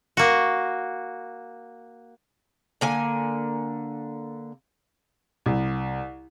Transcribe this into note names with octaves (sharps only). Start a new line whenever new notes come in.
A#3 F#4
D3 A#3 G#5
C2